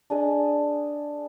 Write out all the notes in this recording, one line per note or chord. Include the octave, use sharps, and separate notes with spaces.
D4 G#4 D#5